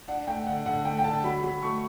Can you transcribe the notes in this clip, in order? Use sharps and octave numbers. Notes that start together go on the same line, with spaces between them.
D4 F#5
A3 G5
D3 F#5
D3 F#5
A3 G5
G5
D3 A5
F#3 B5
F#3 B5
A3 C#6